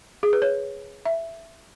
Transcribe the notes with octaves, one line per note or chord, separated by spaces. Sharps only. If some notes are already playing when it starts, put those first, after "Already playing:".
G#4
B4
C#5
E5